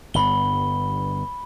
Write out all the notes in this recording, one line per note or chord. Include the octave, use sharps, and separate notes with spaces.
G1 G2 B3 B5 G7